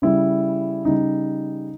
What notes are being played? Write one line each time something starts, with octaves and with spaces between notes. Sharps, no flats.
C#3 G3 E4
C#3 G3 D#4